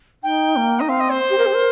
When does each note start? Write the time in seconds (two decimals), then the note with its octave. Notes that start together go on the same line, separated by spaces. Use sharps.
0.23 D#4 G5
0.56 A#3
0.79 D#4 D#5
0.89 C4 F5
1.00 D#5
1.11 C5
1.30 G4
1.38 A#4
1.46 G4
1.54 A#4